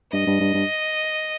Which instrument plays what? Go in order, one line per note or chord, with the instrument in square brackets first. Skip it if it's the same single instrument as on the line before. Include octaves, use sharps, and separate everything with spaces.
[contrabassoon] G2 [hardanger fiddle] D#5
[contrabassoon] G2
G2
G2